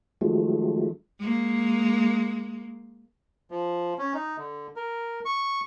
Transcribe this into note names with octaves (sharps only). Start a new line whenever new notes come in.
D#3 F3 F#3 G#3 A3
G#3 A#3
F3
C#4
D#4
D3
A#4
C#6